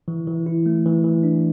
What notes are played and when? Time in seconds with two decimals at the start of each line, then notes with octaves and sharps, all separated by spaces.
0.08 E3
0.27 E3
0.46 E4
0.66 A3
0.86 E3
1.04 E3
1.23 D4